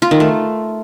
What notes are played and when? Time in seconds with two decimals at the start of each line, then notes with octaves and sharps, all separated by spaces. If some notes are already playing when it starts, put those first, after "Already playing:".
0.02 F4
0.11 D#3
0.20 A3